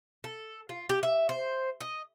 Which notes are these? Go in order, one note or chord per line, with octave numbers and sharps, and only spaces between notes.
A4
F4
G4
E5
C5
D#5